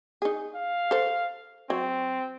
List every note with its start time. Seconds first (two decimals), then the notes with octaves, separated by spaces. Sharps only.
0.22 D#4 G#4
0.55 F5
0.91 A4 C5
1.70 F#3 C4